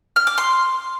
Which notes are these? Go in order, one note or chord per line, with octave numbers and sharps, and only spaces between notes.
F6
D6
C6